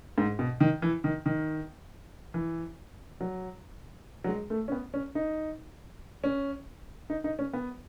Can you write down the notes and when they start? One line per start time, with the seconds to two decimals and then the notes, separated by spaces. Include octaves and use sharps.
0.18 G#2
0.39 B2
0.60 D#3
0.82 E3
1.04 D#3
1.26 D#3
2.34 E3
3.21 F#3
4.24 F#3
4.28 G#3
4.50 A3
4.68 C#4
4.72 B3
4.94 C#4
5.15 D#4
6.24 C#4
7.10 D#4
7.24 D#4
7.39 C#4
7.53 B3